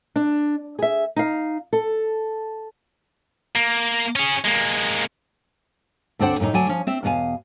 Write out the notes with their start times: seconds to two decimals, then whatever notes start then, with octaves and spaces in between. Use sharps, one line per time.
0.16 D4
0.79 G#4 E5
1.16 D#4 F5
1.73 A4
3.55 A#3
4.16 C#4 G#4
4.44 G#3 A#3
6.19 D2 C4 D4 C5 F#5
6.40 F#2 A2 C3 D#4
6.53 D2 F#3 D4 G#5
6.69 F3 C#4
6.87 C4 E5
7.03 E2 B2 B3 F5 G#5